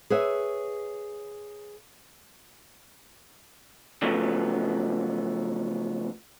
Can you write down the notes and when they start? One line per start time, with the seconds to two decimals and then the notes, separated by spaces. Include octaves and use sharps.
0.10 G#4 B4 C#5 E5
4.02 C#3 F3 F#3 A3 B3